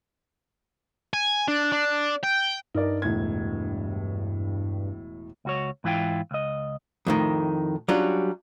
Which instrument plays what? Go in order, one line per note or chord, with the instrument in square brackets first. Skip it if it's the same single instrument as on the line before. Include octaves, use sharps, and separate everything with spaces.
[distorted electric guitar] G#5
D4
D4
G5
[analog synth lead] G2 [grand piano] D#4 A#4 D5
[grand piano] E1 A2 G#6
[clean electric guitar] C#2 F#4 C#5
G#2 E3 E4 F4 G5
C#2 D#5
[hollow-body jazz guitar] F2 A2 D#3
F#3 G3 C#4 D4 F4